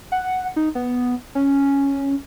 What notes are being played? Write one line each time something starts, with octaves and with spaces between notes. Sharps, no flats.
F#5
D#4
B3
C#4